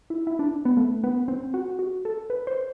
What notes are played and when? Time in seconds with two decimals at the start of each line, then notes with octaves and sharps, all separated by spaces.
0.10 E4
0.27 E4
0.39 D4
0.65 B3
0.77 A3
1.04 B3
1.28 C4
1.54 F#4
1.79 F#4
2.05 A4
2.30 B4
2.47 C5